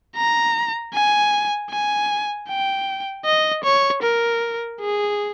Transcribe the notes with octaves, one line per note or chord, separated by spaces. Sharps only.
A#5
G#5
G#5
G5
D#5
C#5
A#4
G#4